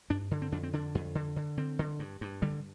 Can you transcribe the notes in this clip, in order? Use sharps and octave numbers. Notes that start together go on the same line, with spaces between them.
G2 D4
D3
C4
F2 D4
C4
D3 D4
F2
D3
D3
D3 C4
D3
G2
G2
D3 G3